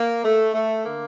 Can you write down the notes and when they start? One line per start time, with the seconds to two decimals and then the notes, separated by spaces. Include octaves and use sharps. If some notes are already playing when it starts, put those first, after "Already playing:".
Already playing: A#3
0.24 A3
0.54 A3
0.85 D3 A#3